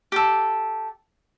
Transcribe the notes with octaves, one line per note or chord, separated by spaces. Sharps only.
G4 A4